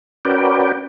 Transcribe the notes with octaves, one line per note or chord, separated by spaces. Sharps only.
C#4 F#4 A#4 B4 D5 G5